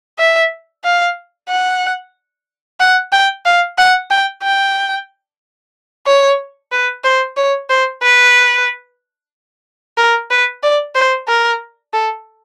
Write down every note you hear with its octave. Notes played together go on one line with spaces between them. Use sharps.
E5
F5
F#5
F#5
G5
F5
F#5
G5
G5
C#5
B4
C5
C#5
C5
B4
A#4
B4
D5
C5
A#4
A4